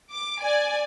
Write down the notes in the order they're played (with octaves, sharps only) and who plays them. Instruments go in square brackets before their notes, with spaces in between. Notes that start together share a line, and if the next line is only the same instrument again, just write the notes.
[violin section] D6
D5 G#5